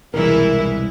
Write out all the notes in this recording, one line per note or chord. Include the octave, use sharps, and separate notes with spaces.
E1 C2 E3 G#3 E4 A#4